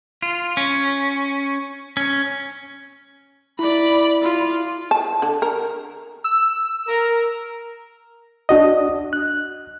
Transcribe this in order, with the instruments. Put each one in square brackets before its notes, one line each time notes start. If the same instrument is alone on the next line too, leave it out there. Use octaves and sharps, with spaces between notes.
[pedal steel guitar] F4
C#4
C#4
[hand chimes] E4 [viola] D5 B5
[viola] F4
[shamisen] A5
D3
A#4
[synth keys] E6
[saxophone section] A#4
[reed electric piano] D4 F#4 D#5
F#6